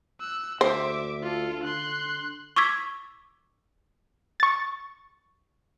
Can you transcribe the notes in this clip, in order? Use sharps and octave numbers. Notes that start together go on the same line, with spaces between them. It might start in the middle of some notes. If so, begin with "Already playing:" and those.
E6 F#6
D2 C5 E5 D6
F4 A4
D3 C6 F#6
C#6 D6 E6 G#6 B6
C#6 A6